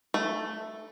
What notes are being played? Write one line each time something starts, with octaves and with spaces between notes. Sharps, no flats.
A3